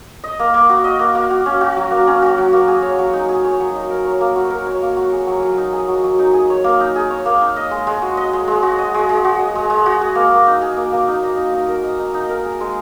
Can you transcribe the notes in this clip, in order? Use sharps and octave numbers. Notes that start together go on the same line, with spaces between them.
D#5
A#3
A#3
F#4
D#5
A#3
A#3
F#4
C#4
F#4
F#3
A#3
C#4
F#4
F#3
A#3
G#4
C#5
F#3
D#4
G#4
C#5
F#3
D#4
A#4
C#5
A#3
F#4
A#4
C#5
A#3
F#4
G#4
F#3
F#3
D#4
G#4
F#3
F#3
D#4
G#4
C#5
A#3
D#4
G#4
C#5
A#3
D#4
D#5
G#3
G#3
F#4
D#5
G#3
G#3
F#4
D#5
G#3
G#3
F#4
D#5
G#3
G#3
F#4
G#4
A#3
A#3
D#4
G#4
A#3
A#3
D#4
D#5
D#4
D#4
A#4
D#5
D#4
D#4
A#4
G#4
G#3